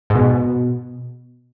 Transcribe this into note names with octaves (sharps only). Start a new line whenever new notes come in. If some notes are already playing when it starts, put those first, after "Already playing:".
G#2
B2